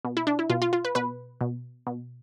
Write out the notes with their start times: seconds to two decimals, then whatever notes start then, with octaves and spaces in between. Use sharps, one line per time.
0.05 B2
0.17 E4
0.27 D4
0.39 E4
0.50 B2 F4
0.62 F4
0.73 F4
0.85 B4
0.95 B2 B4
1.41 B2
1.87 B2